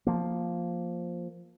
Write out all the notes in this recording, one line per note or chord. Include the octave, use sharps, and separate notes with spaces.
F3 A#3